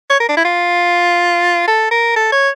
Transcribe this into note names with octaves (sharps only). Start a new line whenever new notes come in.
C#5
A#4
D4
E4
F4
A4
A#4
A4
C#5